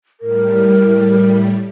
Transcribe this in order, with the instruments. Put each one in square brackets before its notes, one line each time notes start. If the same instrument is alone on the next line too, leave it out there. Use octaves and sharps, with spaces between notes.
[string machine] A2 G3 [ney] A#4